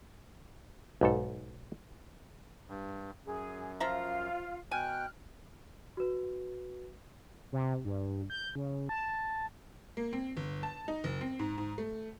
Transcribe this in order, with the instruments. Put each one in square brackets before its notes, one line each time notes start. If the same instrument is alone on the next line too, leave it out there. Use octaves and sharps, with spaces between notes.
[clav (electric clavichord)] B1 G#2 A4
[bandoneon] G2
[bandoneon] F#2 [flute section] G#4
[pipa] F3 E5 A#5 [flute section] F4 F5
[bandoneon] B2 G5 [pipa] G#5 [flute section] F6 F#6
[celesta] F#4 B4
[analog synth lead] C3
G2
G6
C#3
A5
[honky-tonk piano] A#3
C4
G1
A5
D#4
F#1
C4
G#2
G#2
A3